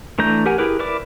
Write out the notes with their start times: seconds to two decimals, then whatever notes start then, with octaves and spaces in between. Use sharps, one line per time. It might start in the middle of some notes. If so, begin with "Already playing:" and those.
0.19 E3 A3 D4 A#5 G6
0.46 G4 A#4 F#5 G#5
0.58 E4 G4 G#4 A#4 B4
0.79 E4 A#4 B4 D5 D6